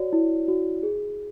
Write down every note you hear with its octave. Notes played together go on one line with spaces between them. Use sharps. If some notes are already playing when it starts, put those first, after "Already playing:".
Already playing: F#4 C#5 D5
E4
F#4
G#4